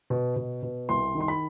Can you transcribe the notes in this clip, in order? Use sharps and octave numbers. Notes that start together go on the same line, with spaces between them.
B2
B2
B2
C2 C6
D#3
C6
B5